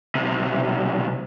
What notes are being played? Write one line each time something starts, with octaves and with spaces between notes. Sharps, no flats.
B1 C3